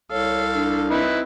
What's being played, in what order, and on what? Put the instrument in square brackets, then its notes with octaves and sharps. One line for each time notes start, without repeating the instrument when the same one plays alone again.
[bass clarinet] C2 [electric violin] A4 F5 [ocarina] C#5
[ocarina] D4
[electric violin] C4 [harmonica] D#4 E4 B4